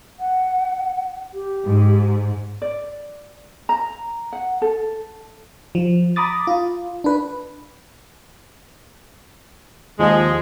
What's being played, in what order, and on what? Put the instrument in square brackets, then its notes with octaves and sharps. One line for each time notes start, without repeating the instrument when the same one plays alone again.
[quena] F#5
G4
[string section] G#2
[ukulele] D5
A#5
F#5
A4
[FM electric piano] F3
A#5 B5 D6 D#6 A6
F4
D4 B4
[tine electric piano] D#2 F3 [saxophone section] G#3